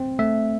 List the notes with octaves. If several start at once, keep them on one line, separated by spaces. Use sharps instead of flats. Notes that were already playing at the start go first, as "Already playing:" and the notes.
Already playing: C4
A3 E5